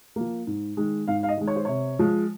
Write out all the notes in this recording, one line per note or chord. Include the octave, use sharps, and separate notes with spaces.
F3 A#3
G#2
D#3 G#3
G#2 F5
F5
D#5
D#3 G#3
C#5
C5
C3 C#5
F3 G#3